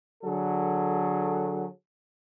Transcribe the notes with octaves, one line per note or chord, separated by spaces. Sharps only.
D3 F#3 G#4 A4